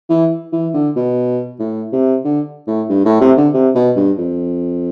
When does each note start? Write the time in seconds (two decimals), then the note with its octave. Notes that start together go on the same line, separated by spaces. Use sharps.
0.10 E3
0.53 E3
0.74 D3
0.96 B2
1.59 A2
1.93 C3
2.25 D3
2.67 A2
2.89 G2
3.05 A2
3.21 C3
3.37 D3
3.54 C3
3.75 B2
3.96 G2
4.18 F2